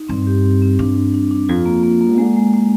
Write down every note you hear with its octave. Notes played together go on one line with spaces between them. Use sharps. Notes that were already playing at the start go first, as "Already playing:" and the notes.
Already playing: D#4
G2 C4
G4
C4
C4
G2 D4
D4
D4
D4
F2 F4
A#3
A#3
A#3
D3 G#3
G#3
G#3